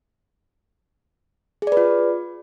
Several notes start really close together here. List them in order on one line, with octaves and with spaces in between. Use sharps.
G#4 D5 B4 F4